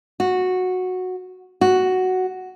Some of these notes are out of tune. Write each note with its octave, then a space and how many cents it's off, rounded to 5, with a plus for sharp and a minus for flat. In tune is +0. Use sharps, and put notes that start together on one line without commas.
F#4 -10
F#4 +5